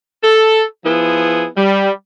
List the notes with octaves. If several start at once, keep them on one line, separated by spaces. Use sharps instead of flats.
A4
F3 B3 E4 G#4
G3